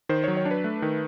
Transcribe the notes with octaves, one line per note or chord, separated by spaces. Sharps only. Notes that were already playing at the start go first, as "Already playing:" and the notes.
D#3 C5
F#3 C#5
C#5
D4
B4
A3
D#3